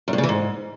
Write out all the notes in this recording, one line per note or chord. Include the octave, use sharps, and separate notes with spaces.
F#2
G2
C#3
E3
G#2